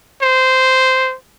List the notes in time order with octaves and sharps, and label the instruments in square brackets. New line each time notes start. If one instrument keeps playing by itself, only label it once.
[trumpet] C5